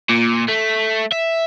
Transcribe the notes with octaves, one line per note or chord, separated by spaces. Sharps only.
A#2
A3
E5